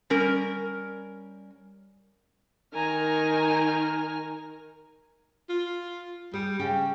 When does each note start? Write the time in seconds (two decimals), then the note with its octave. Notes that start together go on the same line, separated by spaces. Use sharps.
0.10 G3 C#4 A#4
2.74 D#3 G#5 A#5 F6
5.49 F4
6.34 G3 G#4
6.60 C#3 G4